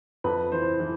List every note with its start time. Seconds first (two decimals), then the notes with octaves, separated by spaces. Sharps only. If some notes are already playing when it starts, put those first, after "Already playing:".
0.24 F2 B4
0.52 E3 C5
0.80 E3